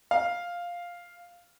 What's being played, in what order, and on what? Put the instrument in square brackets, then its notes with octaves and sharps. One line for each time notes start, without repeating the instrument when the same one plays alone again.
[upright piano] F5